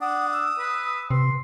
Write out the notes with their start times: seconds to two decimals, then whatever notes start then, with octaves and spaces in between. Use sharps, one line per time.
0.01 D4 F#5 D#6
0.33 E6
0.59 B4
1.10 C3 B4 C6